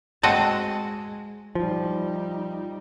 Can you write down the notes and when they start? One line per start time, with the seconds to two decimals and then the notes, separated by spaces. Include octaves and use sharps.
0.23 G#3 C4 F#4 D#5 A5
1.55 F3 G3 D#4